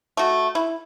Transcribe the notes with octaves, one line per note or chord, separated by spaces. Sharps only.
A3 F#4
E4